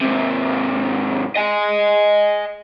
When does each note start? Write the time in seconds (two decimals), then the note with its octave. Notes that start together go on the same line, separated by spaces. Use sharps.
0.01 G#2 C3
1.36 D#5 G#5